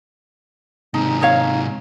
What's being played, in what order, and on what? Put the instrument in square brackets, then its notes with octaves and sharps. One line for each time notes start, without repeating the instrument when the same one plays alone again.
[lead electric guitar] G#2 C3 [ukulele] D#4
[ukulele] D#4 C#5 F5